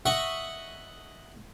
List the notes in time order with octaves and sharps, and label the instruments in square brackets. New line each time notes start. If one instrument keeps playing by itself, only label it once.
[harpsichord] D#5 E5 F#5 C#6